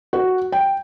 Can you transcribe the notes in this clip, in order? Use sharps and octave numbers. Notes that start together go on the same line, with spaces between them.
F#4
G5